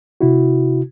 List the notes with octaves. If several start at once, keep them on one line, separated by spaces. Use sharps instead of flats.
C3 E4 F#4